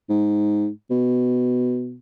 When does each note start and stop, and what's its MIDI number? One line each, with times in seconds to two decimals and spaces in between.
0.09 0.68 44
0.91 1.97 47